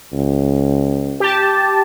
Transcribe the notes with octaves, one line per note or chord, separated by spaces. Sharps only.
C#2
G4 A5